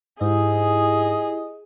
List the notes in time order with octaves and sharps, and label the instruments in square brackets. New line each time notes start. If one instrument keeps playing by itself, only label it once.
[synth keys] G#2 [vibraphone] E4 G4 [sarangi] G#4 [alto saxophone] D#5